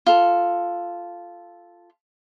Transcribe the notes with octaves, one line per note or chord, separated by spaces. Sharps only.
F4 A4